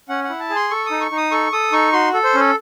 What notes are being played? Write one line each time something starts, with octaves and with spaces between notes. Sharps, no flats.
C#4 F#5
F#5
E4
A5
G#4
C6
A4 C#6
D#6
D#4
C#6
D#4
D#6
A4 C#6
A4 D#6
D#4 C#6
F#4 C6
A4
C5
C#4 A4